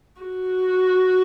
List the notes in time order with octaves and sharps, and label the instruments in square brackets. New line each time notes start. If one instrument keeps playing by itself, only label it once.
[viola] F#4